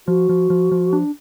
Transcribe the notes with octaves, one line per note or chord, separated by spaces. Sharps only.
F3 F#4
F3
F3
F3
D4